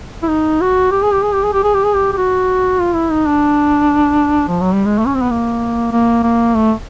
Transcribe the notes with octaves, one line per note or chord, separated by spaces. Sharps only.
E4
D#4
F#4
G4
G#4
G4
G#4
G4
G#4
G4
G#4
G4
G#4
G4
G4
F#4
F4
E4
D#4
D4
F3
F#3
G3
G#3
A3
C#4
C4
B3
A#3
A#3
A#3
A3